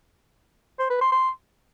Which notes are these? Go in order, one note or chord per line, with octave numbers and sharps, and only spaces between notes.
C5
B4
C6
C6